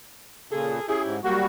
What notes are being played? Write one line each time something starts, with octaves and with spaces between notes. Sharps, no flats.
A#2 C#3 G#4 A4
C#4 E4 G4 G#4
G#2
F#3 G3 A#3 F#4 G4